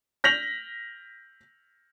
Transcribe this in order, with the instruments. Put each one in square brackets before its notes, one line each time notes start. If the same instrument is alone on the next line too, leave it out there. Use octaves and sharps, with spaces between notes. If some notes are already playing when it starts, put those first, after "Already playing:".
[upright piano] G6 A#6 B6 F7 F#7